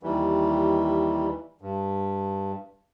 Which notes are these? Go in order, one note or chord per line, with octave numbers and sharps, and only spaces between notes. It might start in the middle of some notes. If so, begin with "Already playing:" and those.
D#2 E3 G3
G2